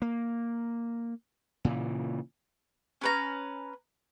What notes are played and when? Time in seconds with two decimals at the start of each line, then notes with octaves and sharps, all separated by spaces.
0.02 A#3
1.65 A#2 C#3 E3
3.01 C#4 B4 A#5